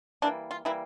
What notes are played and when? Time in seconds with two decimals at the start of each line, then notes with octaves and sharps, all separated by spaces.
0.22 E3 G3 A#3 D4
0.51 F4
0.65 E3 G3 A#3 E4